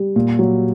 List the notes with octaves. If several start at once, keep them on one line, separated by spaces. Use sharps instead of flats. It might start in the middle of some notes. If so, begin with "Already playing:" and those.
Already playing: G3
A#2
F#3